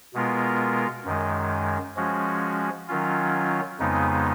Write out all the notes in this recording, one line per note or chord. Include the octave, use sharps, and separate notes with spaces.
B2 G#3 B3 F4 A#4
F#2 D#3 G#3
F3 G#3 C#4 F#4
D#3 F#3 C#4 F4
F2 C#3 G#3 B3 D#4